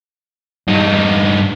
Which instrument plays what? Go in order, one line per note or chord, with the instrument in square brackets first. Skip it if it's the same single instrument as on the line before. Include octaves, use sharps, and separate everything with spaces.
[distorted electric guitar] G2 D#4